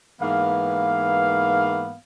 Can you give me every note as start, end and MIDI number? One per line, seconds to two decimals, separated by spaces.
0.21 1.96 44
0.21 1.96 52
0.21 1.96 58
0.21 1.96 59
0.21 1.96 77